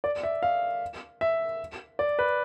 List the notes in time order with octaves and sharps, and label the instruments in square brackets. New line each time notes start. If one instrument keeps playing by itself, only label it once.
[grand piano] D5
E5
F5
E5
D5
B4